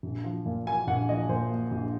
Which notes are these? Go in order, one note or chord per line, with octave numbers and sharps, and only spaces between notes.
A#1
F3
A#2
A#3 G#5
A#1 F#5
F3 D#5
A#2 C5
A#3
A#1